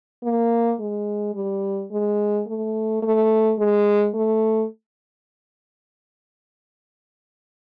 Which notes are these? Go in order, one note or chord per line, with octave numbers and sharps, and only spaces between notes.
A#3
G#3
G3
G#3
A3
A3
G#3
A3